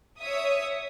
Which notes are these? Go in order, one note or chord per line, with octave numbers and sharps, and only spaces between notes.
C#5 E5 D#6